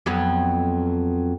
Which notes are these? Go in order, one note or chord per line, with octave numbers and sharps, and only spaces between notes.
F2 F#3 B3